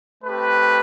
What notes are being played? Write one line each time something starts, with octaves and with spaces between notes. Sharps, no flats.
A3 C4 G4 B4